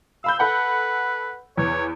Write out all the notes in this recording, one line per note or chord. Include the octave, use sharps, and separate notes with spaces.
F5 B5 E6 G6
A4 B4 F#5 B5
E2 C#5